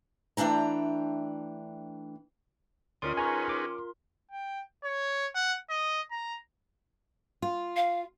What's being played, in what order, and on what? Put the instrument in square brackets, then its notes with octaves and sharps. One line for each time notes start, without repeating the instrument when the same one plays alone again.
[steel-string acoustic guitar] E3 A3 D4 G5 A#5
[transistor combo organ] D2 D5 D#6 [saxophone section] D#3 C#4 [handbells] F4 A#4 C6
[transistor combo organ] D#4 G#4 B4 [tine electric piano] G#5 A#5 C#6
[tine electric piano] D6
[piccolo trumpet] G5
C#5
F#5
D#5
A#5
[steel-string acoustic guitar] F4
[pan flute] F5